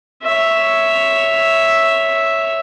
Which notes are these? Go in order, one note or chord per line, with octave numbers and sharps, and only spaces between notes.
C#5 E5